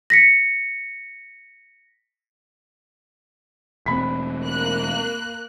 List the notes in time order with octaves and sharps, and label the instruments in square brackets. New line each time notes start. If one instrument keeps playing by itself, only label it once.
[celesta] A#6 B6 C#7
[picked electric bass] E1 C4 [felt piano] B5 B6
[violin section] A#3 F#6